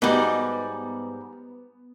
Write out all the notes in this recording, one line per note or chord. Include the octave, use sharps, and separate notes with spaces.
G#2 G3 B3 D#4 F#4